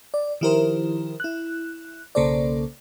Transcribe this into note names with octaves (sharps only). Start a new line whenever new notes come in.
D5
D#3 F3 E4 G4 A#4 C5
E4 F#6
B1 C#3 A#3 A4 C5 D5